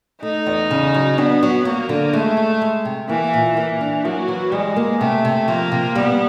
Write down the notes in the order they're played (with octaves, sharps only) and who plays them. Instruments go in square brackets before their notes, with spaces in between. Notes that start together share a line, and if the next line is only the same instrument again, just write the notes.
[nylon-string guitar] A3 [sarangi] D#4
[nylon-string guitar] E2
C#3
F#3
[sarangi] B3 [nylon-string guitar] D4
[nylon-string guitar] F#3
[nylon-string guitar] F#3 [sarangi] A#3
[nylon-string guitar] D3
[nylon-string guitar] G#3 [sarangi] A3
[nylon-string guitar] G#3
G#3
C3
[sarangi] E3 [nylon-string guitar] A#3
[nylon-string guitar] A#2
[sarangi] E3 [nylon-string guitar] A#3
[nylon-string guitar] D4
[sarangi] F#3 [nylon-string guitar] A#3
[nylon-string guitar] E3
[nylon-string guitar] G3 [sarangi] G#3
[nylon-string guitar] A#3
[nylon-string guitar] C3 [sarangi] A3
[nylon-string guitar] C3
[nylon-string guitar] F3 [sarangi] A#3
[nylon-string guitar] C3
[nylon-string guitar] G3 [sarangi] B3